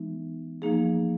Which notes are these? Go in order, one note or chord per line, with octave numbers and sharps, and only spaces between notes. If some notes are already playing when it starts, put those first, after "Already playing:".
Already playing: E3 G#3 B3 D#4
F3 A#3 D#4 G#4